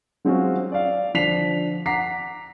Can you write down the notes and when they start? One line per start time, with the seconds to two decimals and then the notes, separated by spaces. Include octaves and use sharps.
0.25 F#3 G#3 C4 C#4 F4 F#4
0.72 D5 F5
1.14 D3 F3 D4 B6 C7 F7
1.86 F#5 A#5 D6 B6 C7